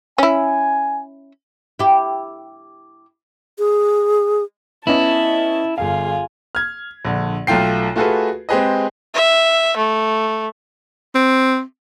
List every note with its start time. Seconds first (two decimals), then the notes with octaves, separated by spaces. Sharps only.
0.18 C#4 E4 G#5
1.79 E4 G4
3.59 G#4
4.87 B3 C#4 E4 D#5 A5
5.78 G1 F4 G#4 F5
6.55 F6 G#6
7.05 A#1 D3
7.47 B1 A3 F4 G5 C7
7.96 A3 F4 F#4 G#4 A4 B4
8.49 G#3 C4 G4 G#4 B4 D#5
9.14 E5
9.77 A3
11.15 C4